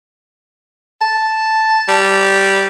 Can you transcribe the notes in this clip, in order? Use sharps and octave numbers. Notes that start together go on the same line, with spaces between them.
A5
G3